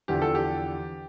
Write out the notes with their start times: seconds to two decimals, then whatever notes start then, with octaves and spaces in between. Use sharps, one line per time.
0.08 E2 D3 F3 G4
0.22 A4
0.35 G4